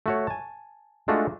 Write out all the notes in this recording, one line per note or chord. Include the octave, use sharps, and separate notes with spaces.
A3 F#4 C#5
G#5 A5
G#3 A3 D4 F4 F#4